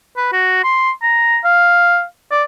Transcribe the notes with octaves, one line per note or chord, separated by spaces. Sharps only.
B4
F#4
C6
A#5
F5
D5